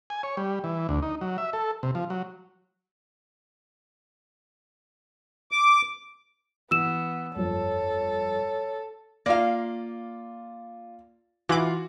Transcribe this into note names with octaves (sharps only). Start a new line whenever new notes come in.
G#5
C#5
G3
E3
D2
D#4
F#3
E5
A4
C3
F3
F#3
D6
E3 B3 E6 E7
G1 F2 A4 C#5
A#3 F4 D5 F5
E3 F4 F#4 D6 F#7